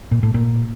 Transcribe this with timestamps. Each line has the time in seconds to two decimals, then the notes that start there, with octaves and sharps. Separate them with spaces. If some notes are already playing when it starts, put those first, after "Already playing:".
0.11 A#2
0.23 A2
0.34 A#2